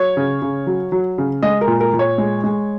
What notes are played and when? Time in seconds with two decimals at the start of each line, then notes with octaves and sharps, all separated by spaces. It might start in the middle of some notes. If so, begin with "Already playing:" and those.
Already playing: F#3 C#5
0.17 C#3
0.42 C#3
0.67 F#3
0.92 F#3
1.18 C#3
1.43 G#3 D#5
1.61 A#4
1.67 A#2
1.81 A#4
1.93 A#2
1.99 C#5
2.18 G#3
2.44 G#3